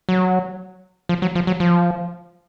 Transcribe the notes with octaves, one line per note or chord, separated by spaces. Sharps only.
F#3
F3
F#3
F3
F#3
F3